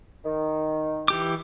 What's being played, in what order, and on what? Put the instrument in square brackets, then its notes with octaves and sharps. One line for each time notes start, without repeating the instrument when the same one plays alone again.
[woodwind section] D#3
[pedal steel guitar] E3 G4 D6